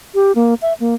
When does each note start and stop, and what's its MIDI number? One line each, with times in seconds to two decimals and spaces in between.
0.15 0.32 67
0.35 0.54 58
0.62 0.73 76
0.80 0.95 58